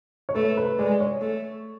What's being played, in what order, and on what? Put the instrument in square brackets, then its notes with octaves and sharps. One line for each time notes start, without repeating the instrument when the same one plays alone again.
[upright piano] C#5
[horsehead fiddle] A3 [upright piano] B4
[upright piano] B4
[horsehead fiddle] G#3 [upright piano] D5
[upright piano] C#5
[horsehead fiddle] A3